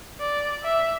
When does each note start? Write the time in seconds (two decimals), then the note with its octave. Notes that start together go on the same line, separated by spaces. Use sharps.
0.20 D5
0.63 E5